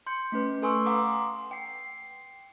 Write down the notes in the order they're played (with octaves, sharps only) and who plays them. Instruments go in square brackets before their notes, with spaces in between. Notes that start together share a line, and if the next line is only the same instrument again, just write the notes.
[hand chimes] C6 G6 C#7
A3 C#4 B4
A4 B4 G#5 C6 C#6 E6
F5 F#5 A#5 D6 D#6
C6
G5 C7